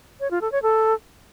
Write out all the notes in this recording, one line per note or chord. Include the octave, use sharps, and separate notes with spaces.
C#5
F4
A4
C#5
A4